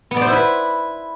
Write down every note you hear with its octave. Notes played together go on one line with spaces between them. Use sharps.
B3
D5
C5
E4
B4